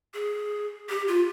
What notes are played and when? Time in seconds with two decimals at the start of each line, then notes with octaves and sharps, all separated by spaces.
0.14 G#4
0.89 G4
1.08 F4